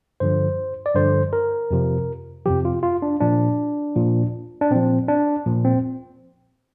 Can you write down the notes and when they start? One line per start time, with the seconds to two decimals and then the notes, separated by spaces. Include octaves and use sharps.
0.20 G2 D3 F3 C5
0.86 D5
0.95 G2 D3 F3 C5
1.33 A#4
1.71 F2 C3 F3
2.46 F2 C3 F3 G4
2.65 F4
2.83 F4
3.02 D4
3.21 A#2 F3 D4
3.96 A#2 F3
4.61 D4
4.71 A#2 F3 C4
5.08 D4
5.46 A#2 F3
5.65 C4